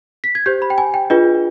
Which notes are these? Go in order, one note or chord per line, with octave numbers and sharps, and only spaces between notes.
B6
G#6
G4 C5 G6
B5
G5
G#5
G5
D4 F4 G#4 B4 D#5